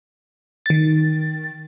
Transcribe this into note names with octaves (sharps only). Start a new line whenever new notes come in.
D#3 A6